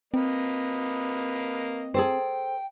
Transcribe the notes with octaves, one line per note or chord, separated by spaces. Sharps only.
A#3 C4 B4 D#5
G#4 A4 C5 G5